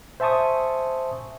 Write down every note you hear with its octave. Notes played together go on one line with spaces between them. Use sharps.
C5 E5 G#5 A5 C#6 D#6